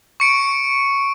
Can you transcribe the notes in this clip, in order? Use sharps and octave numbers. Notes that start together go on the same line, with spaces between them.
C#6 C#7 D7